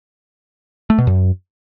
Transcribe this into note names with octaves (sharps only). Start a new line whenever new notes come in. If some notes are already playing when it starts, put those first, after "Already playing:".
A3
B2
F#2